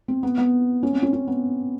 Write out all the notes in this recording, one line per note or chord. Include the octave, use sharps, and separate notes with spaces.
C4
B3
B3
C#4
C4
C#4
C#4
B3